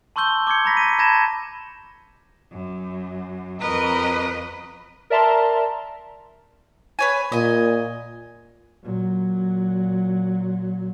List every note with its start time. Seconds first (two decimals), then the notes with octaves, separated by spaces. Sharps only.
0.16 A5 C6 C#6 E6 G6 G7
0.47 D6 G6 G#6 C#7
0.65 A#5 B5 A#6 B6
0.77 D#7
0.99 A5 B5 G#6 A#6 E7
2.52 F#2
3.60 F2 A#4 B4 D#5
5.10 A#4 D5 E5 A5 A#5 C6
6.99 B4 C#5 G#5
7.32 A#2 D#5 G#5
8.82 A#2 F#3